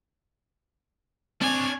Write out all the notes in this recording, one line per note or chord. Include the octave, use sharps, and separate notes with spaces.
C4 D4 C#5 D5 G#5